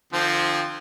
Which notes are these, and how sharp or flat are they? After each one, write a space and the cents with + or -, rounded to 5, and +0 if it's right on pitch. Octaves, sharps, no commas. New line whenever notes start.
D3 +40 F3 +0 C4 +0